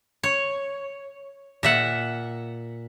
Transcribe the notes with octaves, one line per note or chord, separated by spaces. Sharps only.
C#5
A#2 E5 F#5